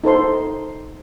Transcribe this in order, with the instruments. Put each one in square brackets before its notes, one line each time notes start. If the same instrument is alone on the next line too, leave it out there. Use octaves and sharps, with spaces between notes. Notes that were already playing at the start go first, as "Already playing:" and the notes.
[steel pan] D#4 A4 C5 C6